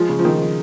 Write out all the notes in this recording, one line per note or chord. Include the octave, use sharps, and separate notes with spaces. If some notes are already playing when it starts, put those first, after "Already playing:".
Already playing: F3 G#3
C#3
F3
D#3 D#4
F3